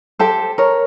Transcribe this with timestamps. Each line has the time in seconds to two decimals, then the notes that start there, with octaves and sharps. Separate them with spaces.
0.19 G4 A4 C5
0.58 A#4 C#5